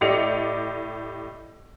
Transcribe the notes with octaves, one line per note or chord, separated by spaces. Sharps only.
A2 G4 D5 D#5 C#7 F7